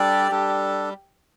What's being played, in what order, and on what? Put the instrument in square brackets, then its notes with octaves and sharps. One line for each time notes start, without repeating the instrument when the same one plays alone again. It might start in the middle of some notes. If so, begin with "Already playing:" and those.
Already playing: [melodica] G3 D4 A4 D5 [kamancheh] G4
[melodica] G3 D4 A4